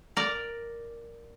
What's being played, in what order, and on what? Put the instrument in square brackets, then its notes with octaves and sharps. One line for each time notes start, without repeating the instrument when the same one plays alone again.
[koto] A#4 D5 A#5